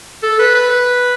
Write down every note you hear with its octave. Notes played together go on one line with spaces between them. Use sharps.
A4
B4
B4
B4